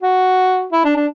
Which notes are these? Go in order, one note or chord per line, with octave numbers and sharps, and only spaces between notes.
F#4
E4
D4
D4